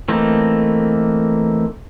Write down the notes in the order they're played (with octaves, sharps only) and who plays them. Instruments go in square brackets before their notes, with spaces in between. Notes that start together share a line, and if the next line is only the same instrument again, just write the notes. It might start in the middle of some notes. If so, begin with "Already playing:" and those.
[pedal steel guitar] E3 A3 A#3 C4 D#4